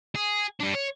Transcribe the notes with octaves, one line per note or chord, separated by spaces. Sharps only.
G#4
G3 D4
C#5